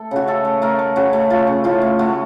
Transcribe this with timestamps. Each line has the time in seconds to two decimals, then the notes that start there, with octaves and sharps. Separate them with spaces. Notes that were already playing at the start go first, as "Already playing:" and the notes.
Already playing: A3 A4
0.11 C#3 F#4
0.27 A3 A4
0.45 A3
0.62 A3 A#4
0.79 A3
0.96 C#3 F#4
1.13 A3
1.30 A3 F4
1.47 C#3
1.64 A2 F4
1.82 A2
1.99 A3 F#4